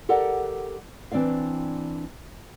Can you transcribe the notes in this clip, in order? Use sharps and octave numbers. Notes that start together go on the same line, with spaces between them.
G4 A4 A#4 D5 F#5
E3 C4 D4 D5 F5